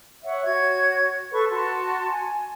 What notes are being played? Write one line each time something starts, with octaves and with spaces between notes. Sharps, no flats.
C#5 E5 F#5
F#4 C#5 G#6
A4 B4 C#6
F#4 A5 C6
G#5